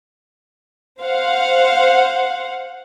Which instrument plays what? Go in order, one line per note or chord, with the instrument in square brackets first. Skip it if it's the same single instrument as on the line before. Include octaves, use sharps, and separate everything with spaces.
[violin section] C5 F5 F#5